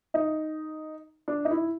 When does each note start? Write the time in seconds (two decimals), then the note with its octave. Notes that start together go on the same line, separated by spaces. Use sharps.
0.14 D#4
1.28 D4
1.45 D#4
1.51 E4